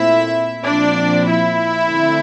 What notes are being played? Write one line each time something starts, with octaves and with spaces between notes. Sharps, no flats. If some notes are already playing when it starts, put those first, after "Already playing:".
Already playing: A#2 A3 C4 E4 E5
A#2 F3 C4 D4 D5
E4 E5
D3 A3 C4